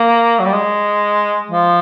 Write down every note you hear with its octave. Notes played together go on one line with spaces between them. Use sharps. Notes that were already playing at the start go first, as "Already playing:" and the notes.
Already playing: A#3
F#3
G3
G#3
F3